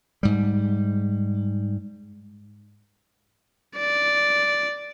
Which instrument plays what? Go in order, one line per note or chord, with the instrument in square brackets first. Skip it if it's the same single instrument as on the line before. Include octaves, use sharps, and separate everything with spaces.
[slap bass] G#2 G3
[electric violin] D5